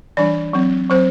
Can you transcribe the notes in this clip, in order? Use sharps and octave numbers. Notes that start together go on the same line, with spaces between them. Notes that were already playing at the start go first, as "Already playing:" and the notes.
E3 G3 D4 D5
F#3 C4
F#3 C4 C5